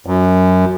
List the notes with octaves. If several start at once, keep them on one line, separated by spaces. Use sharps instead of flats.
F#2